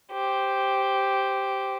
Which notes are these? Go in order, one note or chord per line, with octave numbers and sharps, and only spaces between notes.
G4 C5